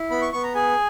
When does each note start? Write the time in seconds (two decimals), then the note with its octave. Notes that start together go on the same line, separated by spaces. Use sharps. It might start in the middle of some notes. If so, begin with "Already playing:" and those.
Already playing: E4
0.10 B3 B5
0.22 C#6
0.32 B3 C#6
0.43 A#5
0.55 G#4 G#5